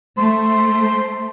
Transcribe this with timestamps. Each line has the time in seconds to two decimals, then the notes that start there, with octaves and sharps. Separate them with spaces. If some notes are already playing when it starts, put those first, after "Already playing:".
0.18 A3 C5